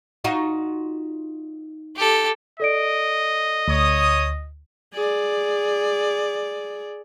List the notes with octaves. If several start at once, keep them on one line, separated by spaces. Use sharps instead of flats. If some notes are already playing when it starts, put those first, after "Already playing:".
D#4 F4 F#4
G4 A4
A4 D5 D#5 D7
D2 C#5 D#6
G#4 D5